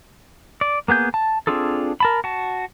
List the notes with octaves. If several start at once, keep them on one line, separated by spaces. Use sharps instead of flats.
D5
A#3 B3 G#4 G6
A5
C4 D4 F4 G#4 A4
A#4 A5 B5
F#4 A5